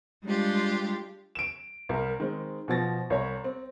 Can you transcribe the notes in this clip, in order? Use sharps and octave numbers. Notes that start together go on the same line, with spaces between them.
G3 G#3 D4 F4 G4
D7 E7
C2 A#4
D#3 G#3 C4
B2 F3 A6 A#6
C2 C#5 A#5
C4